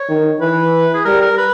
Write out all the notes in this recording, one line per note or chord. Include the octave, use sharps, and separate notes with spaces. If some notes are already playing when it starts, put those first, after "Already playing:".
Already playing: C#5
D#3
E3 B4
G#4
G3 A#4
A#4
B4